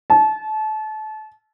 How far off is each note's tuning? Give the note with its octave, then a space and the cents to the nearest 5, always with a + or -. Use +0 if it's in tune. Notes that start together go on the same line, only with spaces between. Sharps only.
A5 -30